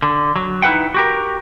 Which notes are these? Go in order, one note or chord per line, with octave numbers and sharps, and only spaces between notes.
D3
F#3
D#4 E4 B4 F#5 G5
F#4 G4 A#4